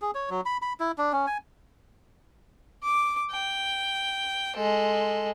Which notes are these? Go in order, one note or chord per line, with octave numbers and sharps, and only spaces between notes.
G#4
C#5
F#3
B5
B5
E4
D4
C#4
G#5
D6
G5
G#3 A4